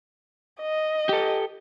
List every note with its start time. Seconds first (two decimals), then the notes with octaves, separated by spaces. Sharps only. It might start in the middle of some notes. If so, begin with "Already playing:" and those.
0.61 D#5
1.09 G4 A4